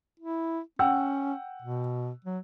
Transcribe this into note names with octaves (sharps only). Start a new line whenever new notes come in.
E4
C#4 F#5 G5 E6
B2
F#3